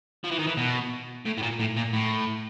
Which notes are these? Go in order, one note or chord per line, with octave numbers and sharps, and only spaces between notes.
F3
E3
D#3
E3
B2
A2
A2
A#2
A2
A#2
A2